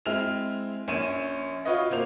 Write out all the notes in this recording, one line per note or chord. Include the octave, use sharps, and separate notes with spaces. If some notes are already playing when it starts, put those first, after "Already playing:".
G#3 C4 E4 F6 F7
A#1 C#4 D#7 E7
F4 F#4 B4 C#5 D#5
C3 A#3 C5 F7